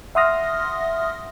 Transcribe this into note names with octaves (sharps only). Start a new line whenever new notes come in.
E5 F#5 C6 D#6 F6 A#6